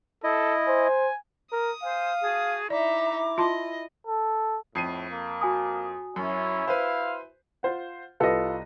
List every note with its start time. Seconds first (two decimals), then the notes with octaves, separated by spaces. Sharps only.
0.24 E4 A4 D#5
0.68 C5 G#5
1.52 A#4 D#6
1.83 C5 F5 G#5
2.22 F#4 G#4 A5
2.70 D#4 E4 D5 E5 A#5 D6
3.38 F4 D#5 A5 C6
4.07 A4
4.75 F2 A2 C7 D#7
5.11 A#3
5.41 F#4 G#5 D#6
6.16 F#2 C#4 E4
6.68 B4 C5 F5
7.63 F4 C5 F#5
8.20 C2 F4 G4 A4 B4 D#5